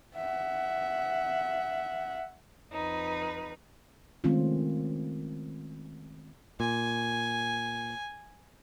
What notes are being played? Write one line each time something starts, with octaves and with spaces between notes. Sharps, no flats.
E5 F#5
F2 D#4 B4
D#3 G#3 A3 C4 C#4 F4
A#2 G#5